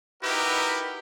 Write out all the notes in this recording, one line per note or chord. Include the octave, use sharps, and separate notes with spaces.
D#4 E4 F#4 G4 A#4 B4